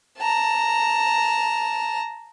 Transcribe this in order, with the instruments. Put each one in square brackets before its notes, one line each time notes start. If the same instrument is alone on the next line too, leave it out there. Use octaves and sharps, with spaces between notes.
[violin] A5 A#5